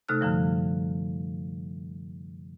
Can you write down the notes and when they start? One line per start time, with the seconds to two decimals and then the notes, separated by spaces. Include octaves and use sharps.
0.09 C3 A3 D#4 A4 F6 F#6
0.21 F#2 D3 F3 G3